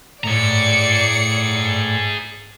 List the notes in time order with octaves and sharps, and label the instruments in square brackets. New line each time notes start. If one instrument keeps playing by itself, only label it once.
[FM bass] A2 [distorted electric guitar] G#4 A#5 [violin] D5 C#7